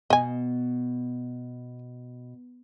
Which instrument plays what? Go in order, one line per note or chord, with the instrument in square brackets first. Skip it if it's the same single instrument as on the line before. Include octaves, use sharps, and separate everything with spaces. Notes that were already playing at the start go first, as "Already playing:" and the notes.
[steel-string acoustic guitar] B2 [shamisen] D#5 G#5